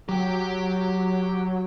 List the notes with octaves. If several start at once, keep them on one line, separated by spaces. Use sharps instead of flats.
F#3 G4 G5